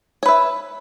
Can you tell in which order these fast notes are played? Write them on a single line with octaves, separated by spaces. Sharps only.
C#5 B4 E5